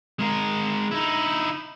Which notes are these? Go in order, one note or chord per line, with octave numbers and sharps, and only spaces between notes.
G#3 A#4
D#4 E4